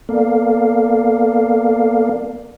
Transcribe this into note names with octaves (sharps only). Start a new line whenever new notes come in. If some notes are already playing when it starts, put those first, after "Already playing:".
A#3 B3 A4 A#4 D5 F5